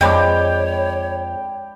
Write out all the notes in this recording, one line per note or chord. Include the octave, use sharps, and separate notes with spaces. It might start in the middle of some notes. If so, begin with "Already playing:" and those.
F2 G#3 D4 C#5 G5 B5 D6